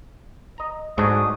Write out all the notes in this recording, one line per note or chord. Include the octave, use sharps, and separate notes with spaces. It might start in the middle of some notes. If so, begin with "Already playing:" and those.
D#5 A#5
G#2 F#3 A3 D4 D#6